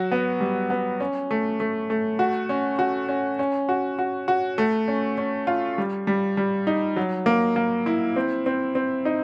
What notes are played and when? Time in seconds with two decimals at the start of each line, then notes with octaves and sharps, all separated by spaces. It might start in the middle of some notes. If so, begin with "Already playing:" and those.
Already playing: F#3 F#4
0.11 B3
0.40 G3
0.70 B3
1.00 C#4
1.31 A3
1.60 A3
1.90 A3
2.19 F#4
2.49 C#4
2.79 F#4
3.08 C#4
3.39 C#4
3.69 F#4
3.99 F#4
4.28 F#4
4.58 A3
4.88 C#4
5.18 C#4
5.47 F4
5.78 G3
6.07 G3
6.37 G3
6.67 D#4
6.96 F#3
7.26 A#3
7.56 A#3
7.86 E4
8.16 C4
8.46 C4
8.75 C4
9.05 D#4